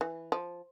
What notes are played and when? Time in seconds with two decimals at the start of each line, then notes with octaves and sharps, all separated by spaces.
0.01 E3
0.32 F3